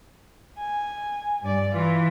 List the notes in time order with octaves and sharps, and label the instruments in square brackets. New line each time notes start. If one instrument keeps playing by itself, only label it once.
[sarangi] G#5
[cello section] G2 D5
[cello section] E3 [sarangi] F4